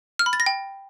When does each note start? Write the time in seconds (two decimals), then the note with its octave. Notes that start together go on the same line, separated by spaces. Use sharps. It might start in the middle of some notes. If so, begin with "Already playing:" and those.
0.19 F6
0.26 B5
0.33 A6
0.40 A#6
0.46 G5